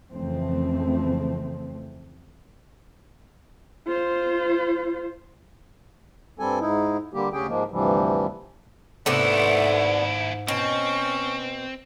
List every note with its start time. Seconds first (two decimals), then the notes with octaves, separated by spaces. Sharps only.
0.12 F2 C#3 E3 A3 C4
3.87 F4 C5
6.39 G2 G3 C4 A4 G#5
6.60 G#2 D#4 E4
7.13 D3 G3 A#3 G4
7.33 D2 C#3 C#4 G4 G#4 G5
7.48 G#2 F3 G#3 A#3
7.71 D2 G2 C3 E3 F3 G3
9.06 D#2 G#2 C3 A3 B3 D4 E4
10.48 B2 C4 C#4